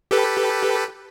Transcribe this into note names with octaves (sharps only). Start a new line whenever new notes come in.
G4 A4 B4